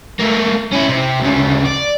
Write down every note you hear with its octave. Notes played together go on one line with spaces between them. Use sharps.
A3 A#3
C#4 E4
C3
D2 C#3
D5